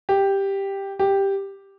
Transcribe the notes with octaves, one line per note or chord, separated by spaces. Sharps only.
G4
G4